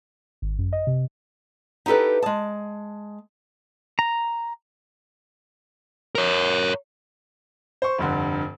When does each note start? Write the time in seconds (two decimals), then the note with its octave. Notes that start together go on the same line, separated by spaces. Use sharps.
0.42 G#1
0.58 F#2
0.73 D#5
0.87 C3
1.86 D#4 E4 G4 A4 B4
2.22 G#3 A5
3.99 A#5
6.15 A#4 C#5
7.82 C5 C#6
7.98 F1 G2 D3